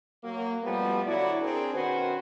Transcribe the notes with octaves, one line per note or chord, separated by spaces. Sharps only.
F#3 A#3
B2 F3 G3 A3 B3
D3 F#3 E4 F#4 D5
C4 D4 G#4 A#4
B2 D#3 C#4 F#4 B4 C5